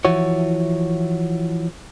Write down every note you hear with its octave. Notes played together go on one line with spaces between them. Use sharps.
E3 F3 E4 F#4 C#5